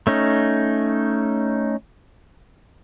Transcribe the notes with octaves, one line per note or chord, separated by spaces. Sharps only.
A3 C#4 D#4